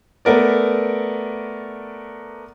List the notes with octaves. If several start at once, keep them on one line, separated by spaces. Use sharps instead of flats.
A3 B3 A#4 D5